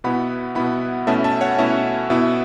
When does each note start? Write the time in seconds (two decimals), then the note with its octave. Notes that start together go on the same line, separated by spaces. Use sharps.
0.04 B2 B3 E4 F#5 B5
0.55 B2 B3 E4 F#5 B5
1.07 B2 A3 C#4 E4 E5 A5
1.24 E5 A5
1.41 C#5 F#5
1.58 B2 A3 C#4 E4 E5
2.10 B2 B3 E4 E5